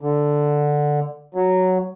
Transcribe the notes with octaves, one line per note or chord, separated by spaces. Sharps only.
D3
F#3